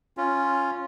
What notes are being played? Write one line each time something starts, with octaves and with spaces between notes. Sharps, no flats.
C#4 F4